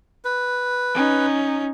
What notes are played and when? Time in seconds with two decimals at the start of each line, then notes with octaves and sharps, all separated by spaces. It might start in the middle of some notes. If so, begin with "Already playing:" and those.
0.25 B4
0.94 C#4 D#4